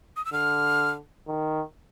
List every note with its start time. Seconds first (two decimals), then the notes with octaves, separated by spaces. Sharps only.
0.16 D#6
0.25 E6
0.33 D3 F6
1.28 D#3